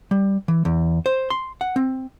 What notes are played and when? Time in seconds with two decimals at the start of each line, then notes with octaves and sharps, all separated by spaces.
0.11 G3
0.48 E3
0.65 E2
1.06 C5
1.30 C6
1.61 F#5
1.76 C4